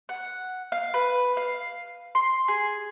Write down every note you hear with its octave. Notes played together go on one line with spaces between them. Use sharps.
F#5
F5
B4
F5
C6
G#4